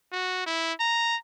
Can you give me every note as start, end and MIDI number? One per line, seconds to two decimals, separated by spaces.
0.12 0.46 66
0.47 0.73 64
0.80 1.16 82